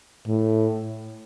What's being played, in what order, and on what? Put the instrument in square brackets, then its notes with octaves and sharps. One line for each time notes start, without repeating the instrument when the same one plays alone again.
[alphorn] A2